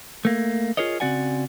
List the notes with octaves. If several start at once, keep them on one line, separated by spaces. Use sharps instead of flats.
A3 A#3
F4 G#4 A#4 C#5 D#5
C#3 C4 F#4 D5 F#5 G#5